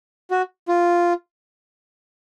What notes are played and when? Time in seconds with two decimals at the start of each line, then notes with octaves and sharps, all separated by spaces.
0.31 F#4
0.68 F4